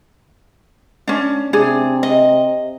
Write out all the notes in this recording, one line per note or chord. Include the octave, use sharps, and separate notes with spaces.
C#4 D4
C3 D4 G#4
D#5